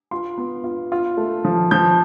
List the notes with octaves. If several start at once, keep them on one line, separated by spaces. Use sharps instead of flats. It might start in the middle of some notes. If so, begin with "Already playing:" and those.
F4 C6
B3
F4
F4
A3
F3
F3 G6